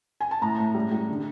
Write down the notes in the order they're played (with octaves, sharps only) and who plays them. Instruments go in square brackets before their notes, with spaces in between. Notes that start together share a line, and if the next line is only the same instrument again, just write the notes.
[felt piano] G#5
A5
A2 A#5
A2
G3
G3
D3